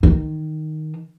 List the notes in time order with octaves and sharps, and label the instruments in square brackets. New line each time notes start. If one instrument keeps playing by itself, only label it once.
[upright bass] D#3